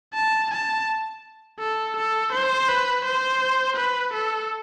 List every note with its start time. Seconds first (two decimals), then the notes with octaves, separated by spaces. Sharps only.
0.14 A5
0.51 A5
1.59 A4
1.96 A4
2.33 C5
2.68 B4
3.05 C5
3.76 B4
4.13 A4